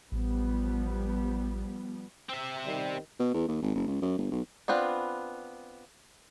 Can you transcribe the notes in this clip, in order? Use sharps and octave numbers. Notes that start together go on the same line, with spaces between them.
A1 F3 G3 B3
C4 E5
D#3 G3
B2
E2
D#2
G#1
F#1
C#2
F#2
G1
B1
B3 C4 D4 F4 B4